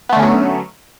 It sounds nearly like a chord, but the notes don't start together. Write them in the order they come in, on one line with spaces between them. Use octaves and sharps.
B3 A3 D3 C#4 F#3